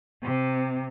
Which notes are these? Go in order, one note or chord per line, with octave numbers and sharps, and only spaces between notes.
C3